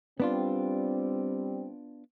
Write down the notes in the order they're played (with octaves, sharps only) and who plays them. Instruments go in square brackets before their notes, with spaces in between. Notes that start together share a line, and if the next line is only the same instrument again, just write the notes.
[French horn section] G3 C4 [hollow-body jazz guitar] B3 D4 F4